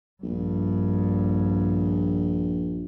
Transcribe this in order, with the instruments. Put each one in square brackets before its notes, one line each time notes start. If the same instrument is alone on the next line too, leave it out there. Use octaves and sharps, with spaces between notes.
[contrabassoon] A#1 [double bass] G2